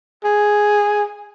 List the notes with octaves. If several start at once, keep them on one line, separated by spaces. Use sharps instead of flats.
G#4